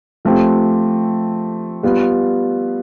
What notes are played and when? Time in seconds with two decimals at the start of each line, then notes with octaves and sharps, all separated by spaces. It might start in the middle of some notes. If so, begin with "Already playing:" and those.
0.25 F3 A3 C4 G4
1.83 G3 B3 F4